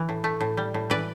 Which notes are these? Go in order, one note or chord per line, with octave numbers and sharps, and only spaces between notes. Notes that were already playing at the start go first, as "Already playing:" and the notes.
Already playing: E3
A2
A3
A2
G3
A2
E3 B4 D5